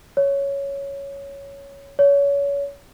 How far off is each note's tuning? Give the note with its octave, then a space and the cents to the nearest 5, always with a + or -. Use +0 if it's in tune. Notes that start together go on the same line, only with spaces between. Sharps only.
C#5 +5
C#5 +30